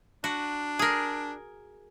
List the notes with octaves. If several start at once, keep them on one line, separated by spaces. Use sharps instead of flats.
D4 F#4
G#4 A#4